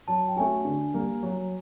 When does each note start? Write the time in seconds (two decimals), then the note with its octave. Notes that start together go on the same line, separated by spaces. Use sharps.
0.08 F#3 A5
0.28 G5
0.36 A3 C#4 F#4 G#5
0.65 D3
0.94 G3 A#3
1.23 F#3